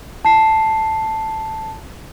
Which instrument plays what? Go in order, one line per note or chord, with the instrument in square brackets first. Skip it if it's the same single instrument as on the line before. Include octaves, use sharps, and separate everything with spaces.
[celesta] A5 C7